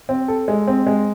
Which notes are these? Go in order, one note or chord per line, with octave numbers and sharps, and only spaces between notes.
C4
A4
G#3
C4
G#3